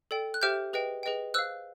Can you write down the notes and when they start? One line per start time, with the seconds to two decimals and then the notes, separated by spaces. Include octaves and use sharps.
0.11 A4 D5 G5
0.34 F#6
0.41 G4 C5 E5 G5 F6 G6
0.73 G#4 B4 D#5 G5
1.03 G#4 B4 D#5 G5
1.34 C5 F5 E6 F#6